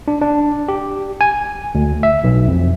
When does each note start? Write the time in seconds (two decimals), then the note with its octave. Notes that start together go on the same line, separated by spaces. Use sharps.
0.08 D4
0.22 D4
0.68 G4
1.21 G#5
1.75 D2
2.03 E5
2.24 B1
2.48 F2